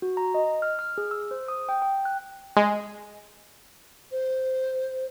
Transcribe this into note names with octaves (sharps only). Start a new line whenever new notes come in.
F#4
A#5
D#5
F6
F6
G#4
E6
C5
D#6
G5
G5
F#6
G#3
C5